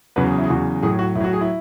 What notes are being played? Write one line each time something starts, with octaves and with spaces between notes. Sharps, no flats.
E2 C#3 F#3 B4
G#4
E4
G#4
E2 C#3 F#3 F#4
A2 F#3 G#4
F#4
A2 E4
F#3 F#4
G#4
E4